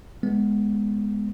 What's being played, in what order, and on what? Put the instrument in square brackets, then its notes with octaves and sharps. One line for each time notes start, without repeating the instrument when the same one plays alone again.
[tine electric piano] G#3 B3